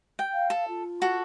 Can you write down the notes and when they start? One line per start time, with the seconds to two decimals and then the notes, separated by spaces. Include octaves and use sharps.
0.19 G5
0.33 F5
0.50 A4
0.68 F4
1.02 F#4 A4